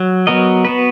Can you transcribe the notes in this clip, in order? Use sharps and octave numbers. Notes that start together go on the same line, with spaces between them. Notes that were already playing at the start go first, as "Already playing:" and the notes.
Already playing: F#3
F#3 B3 F#4 A#4 D#5
B3 F#4 B4